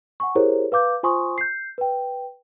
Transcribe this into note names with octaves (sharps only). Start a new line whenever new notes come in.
F#5 G#5 C#6
E4 G4 G#4 A#4 C5 C#5
B4 F5 D6 G6
F4 C5 G#5 C6 C#6 D#6
G6 C7
B4 G5